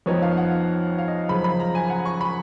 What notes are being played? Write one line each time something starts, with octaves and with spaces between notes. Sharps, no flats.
F2 F3 B3 D#4 C#5
F5
F#5
F5
D#5
F#2 C#3 F3 B5
B5
A#5
G#5
F#5
C#6
B5